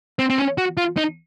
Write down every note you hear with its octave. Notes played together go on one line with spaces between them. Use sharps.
C4
C4
C#4
F#4
F4
D#4